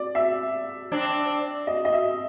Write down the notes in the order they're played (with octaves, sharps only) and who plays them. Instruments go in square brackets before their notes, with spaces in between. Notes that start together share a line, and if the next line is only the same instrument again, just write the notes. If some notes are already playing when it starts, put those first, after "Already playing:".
Already playing: [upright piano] D5
E5
[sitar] C4 D4
[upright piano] D#5
D#5
E5